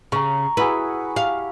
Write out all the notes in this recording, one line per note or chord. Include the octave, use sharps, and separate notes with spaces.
C#3 A#5 C#6
E4 F#4 G#4 B4
G4 F5